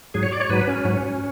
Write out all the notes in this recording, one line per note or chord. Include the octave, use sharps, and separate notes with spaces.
G#2 F#3 G#4
C#5
D5
C#5
G#2 F#3 B4
C#4
G#2 F#3